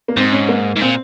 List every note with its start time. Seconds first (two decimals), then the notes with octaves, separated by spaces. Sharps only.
0.08 A#3
0.16 G#2 C4
0.32 C#4
0.49 A#3
0.76 G#2
0.81 A#2 C4